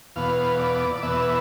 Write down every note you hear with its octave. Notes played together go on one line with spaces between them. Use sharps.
E2 B2 B3 F5
D5
D5
E2 B2 B3 E5